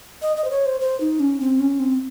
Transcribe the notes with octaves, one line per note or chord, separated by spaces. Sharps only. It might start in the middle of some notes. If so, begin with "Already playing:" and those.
D#5
D#5
C5
C#5
C5
C5
D#4
C#4
C4
C#4
C4